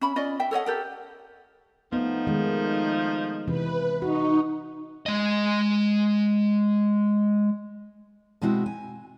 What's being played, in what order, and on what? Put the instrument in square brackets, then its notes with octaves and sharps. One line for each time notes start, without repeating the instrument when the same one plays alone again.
[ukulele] C#4 E5 B5
C#4 F4 D5 D#5
E5 G5
A4 C#5 D#5 F#5
G4 A4 A#4
[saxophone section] F3 A3 D#4 [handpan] B3
[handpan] D#3 G#3
[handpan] C3 E3 [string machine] B4
[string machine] D#4 [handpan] F#4
[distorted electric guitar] G#3 D#5
[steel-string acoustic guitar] B2 G#3 C4 E4 F#4
G#5